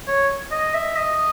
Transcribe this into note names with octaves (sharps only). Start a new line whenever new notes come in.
C#5
D#5
E5
D#5